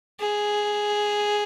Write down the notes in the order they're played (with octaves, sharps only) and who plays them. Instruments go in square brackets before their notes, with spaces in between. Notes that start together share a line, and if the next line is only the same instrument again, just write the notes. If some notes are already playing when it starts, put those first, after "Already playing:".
[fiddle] G#4